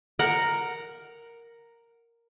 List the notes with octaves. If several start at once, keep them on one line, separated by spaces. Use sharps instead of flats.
A#4 F#5